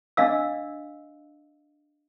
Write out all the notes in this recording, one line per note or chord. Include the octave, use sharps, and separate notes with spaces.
D4 D#5 F5 E6